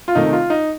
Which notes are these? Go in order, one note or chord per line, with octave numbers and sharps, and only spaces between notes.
F4
C3 D#3 A3 D#4
F4
D#4